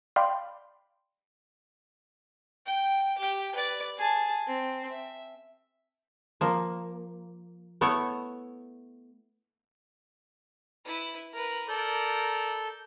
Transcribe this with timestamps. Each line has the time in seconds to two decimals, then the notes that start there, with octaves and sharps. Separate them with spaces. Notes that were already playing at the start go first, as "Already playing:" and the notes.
0.16 D5 F5 G5 B5 C6
2.67 G5
3.18 G4 G5
3.55 B4 D5
3.98 G#4 A5
4.47 C4
4.91 E5
6.41 F3 A#3
7.81 A3 B3 E4 C#5
10.85 E4 B4
11.33 A#4 B4
11.68 A4 A#4 D5 G6